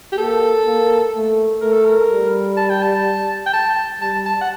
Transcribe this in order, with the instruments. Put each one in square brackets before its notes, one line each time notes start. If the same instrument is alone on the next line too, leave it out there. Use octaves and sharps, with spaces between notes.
[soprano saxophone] G4
[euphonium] A#3 [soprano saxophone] A4
[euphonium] A#3
A3
[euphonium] A3 [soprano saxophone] A#4
[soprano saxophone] A4
A#4
[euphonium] G3
[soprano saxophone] A5
G5
A5
G5
A5
[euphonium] G3 [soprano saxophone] A5
[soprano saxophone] A5
F#5